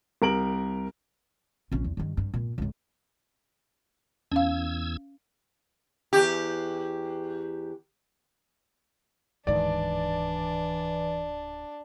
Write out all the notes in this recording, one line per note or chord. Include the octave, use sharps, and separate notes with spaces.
C2 A#4 D7 F#7
A#1 C#4
E2
G2 D#3
G2
A#2
C#2 A2
E2 C#4 F5 E6 G#6
E2 G4
D1 G#2 D#3 E3 D4 D5